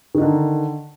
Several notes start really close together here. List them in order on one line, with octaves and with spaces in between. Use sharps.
D#3 D#4 D3